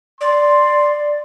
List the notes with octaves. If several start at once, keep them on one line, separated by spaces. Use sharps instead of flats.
D5 C6